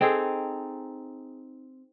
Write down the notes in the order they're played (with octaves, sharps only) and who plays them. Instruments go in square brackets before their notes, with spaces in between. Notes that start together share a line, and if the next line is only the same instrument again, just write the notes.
[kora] C4 D#4 G#4 A4